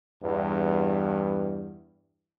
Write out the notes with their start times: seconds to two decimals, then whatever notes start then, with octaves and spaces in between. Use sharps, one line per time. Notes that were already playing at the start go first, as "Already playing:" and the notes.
0.22 E2 G2